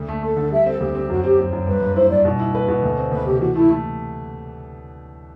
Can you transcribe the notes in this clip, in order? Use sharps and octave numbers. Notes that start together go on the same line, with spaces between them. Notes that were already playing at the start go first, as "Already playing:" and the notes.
Already playing: D2
A3
A3 A4
D3
G3 E5
C4 A4
D2 G4
C4
F#2 F#4
C4 G4
F#2
F#2
G2 B4
G2
E4 C5
G2 D5
B2
E4
B4
B2
D2
C4
D2 B4
C3 G4
E3 F#4
A3 E4
A3